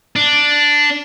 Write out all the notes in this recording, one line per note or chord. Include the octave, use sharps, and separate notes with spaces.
D4